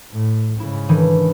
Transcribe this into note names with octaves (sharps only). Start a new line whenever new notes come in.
A2
G#2 C#3 E4
D#3 E3 D4